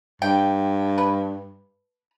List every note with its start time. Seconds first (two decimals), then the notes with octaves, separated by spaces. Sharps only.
0.22 G2 G5
0.98 B4